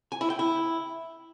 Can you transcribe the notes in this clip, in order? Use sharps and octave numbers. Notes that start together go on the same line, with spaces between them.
G#5
E4
G5
E4